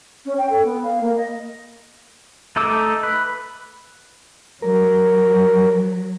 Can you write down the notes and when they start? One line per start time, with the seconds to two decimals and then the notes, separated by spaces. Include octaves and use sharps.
0.25 C#4
0.37 G5
0.49 A4
0.64 B3
0.82 F5
1.00 A#3
1.16 D#5
2.56 A3 D#4 A4 D6 E6
3.03 B4
4.62 F#3 A#4